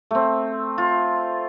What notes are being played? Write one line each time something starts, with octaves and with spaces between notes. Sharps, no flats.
A3 C4
F4